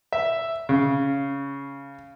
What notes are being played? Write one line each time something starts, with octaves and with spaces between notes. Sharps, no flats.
E5
C#3